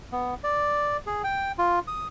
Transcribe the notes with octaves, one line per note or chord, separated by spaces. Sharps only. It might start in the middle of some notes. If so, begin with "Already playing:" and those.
B3
D5
G#4
G5
F4
D#6